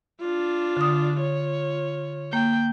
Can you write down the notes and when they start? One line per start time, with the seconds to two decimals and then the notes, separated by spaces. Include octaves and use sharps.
0.21 D4 F4
0.77 D3 D#6
1.18 F4 C#5
2.33 A#3 G5